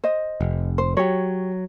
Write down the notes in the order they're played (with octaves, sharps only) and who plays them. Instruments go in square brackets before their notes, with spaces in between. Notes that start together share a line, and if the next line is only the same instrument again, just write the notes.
[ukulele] C5 D#5
[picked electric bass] F1
[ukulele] C5
[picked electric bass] F#3 [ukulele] G4 C#5